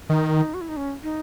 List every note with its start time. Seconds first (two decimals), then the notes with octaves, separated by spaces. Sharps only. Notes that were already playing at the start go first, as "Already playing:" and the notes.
0.09 D#3 D#4
0.54 F#4
0.61 E4
0.69 D#4
0.77 C#4
1.03 D#4